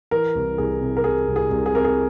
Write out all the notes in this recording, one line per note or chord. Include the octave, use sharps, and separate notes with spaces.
E3 A#4
C2
C2 G#4
C3
A#4
C3 G#4
C2
G#4
C2
G#4
C3 A#4
G#4